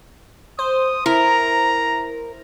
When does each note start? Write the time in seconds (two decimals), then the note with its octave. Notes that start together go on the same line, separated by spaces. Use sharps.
0.59 C5 D#6
1.06 E4 A#4 A#5